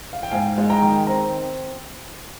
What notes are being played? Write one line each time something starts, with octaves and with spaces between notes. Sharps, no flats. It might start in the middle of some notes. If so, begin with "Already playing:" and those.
F5
G5
G#2 F5 G#5
G#3
G5 A#5
D#3
C4 A#5